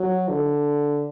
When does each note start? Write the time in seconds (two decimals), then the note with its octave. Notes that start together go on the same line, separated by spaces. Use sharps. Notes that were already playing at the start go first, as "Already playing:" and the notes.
Already playing: F#3
0.29 D3